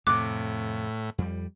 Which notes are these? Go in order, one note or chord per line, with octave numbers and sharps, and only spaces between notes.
F2 A2 C3 D6 F#6
F2 G3